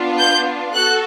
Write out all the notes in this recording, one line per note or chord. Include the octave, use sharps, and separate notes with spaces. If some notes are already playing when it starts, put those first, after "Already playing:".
Already playing: B3 D4 F4
G6
F#4 A4 F#6